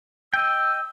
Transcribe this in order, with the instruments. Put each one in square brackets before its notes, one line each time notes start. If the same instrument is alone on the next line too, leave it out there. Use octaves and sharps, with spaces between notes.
[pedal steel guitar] D#5 G5 [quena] E6